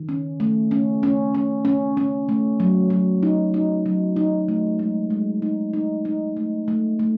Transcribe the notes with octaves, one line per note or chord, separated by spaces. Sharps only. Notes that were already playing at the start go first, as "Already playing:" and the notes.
Already playing: D#3
C#4
A3
C#4
C#4
C#4
C#4
C#4
A3
F#3
F#3
D#4
D#4
F#3
D#4
A3
G#3
G#3
D#4
D#4
D#4
A3
A3
A3